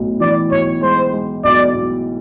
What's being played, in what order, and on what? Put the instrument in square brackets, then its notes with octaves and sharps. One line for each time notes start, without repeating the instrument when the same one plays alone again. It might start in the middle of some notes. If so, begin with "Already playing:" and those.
Already playing: [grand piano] B1 A2
[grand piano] E3 [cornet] D5
[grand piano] B1 [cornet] C#5
[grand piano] G#3 [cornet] C5
[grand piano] G#3
[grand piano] B1 [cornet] D5
[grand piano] B1